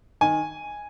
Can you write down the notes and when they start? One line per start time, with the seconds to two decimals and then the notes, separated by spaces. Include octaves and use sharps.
0.21 D#3 G#5